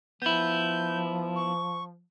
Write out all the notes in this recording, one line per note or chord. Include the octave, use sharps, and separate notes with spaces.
F3 B3 E4 G6
C#6